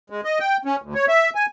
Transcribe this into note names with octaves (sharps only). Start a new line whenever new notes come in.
G#3
D#5
G5
C#4
D2
C#5
E5
G#5